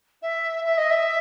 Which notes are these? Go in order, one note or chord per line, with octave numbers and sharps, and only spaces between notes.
E5
E5
D#5
E5